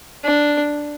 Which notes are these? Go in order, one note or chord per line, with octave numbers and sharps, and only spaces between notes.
D4